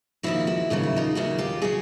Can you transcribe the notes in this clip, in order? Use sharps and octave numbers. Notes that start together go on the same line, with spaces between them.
D#2 C#3 F3 E4 F#4
E4 F#4
D#2 C#3 F#3 F4
E4
D#4 F4
D#2 C#3 F#3 E4 F#4
F4 G4
C#3 F#3 F#4 G#4